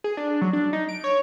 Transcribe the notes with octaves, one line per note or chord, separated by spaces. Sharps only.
G#4
D4
F#3
D4
D#4
D7
C#5